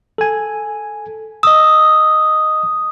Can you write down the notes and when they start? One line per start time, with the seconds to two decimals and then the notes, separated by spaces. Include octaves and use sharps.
0.18 A4 G#5
1.43 D#5 D#6 E6